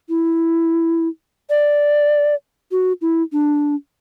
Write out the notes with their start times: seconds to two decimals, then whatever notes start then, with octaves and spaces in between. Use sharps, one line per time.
0.09 E4
1.50 D5
2.72 F#4
3.01 E4
3.33 D4